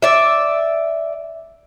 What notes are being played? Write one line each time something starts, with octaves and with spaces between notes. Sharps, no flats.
D5 E5